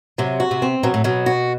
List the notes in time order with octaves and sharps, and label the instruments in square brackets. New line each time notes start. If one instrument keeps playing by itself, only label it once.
[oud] C3 [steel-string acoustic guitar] F#3
[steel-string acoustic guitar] F#4
[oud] C3
[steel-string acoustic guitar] C4
[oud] B2 [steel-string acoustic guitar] F#3
[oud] A2
[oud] B2 [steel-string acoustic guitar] F#3
[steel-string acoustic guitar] F#4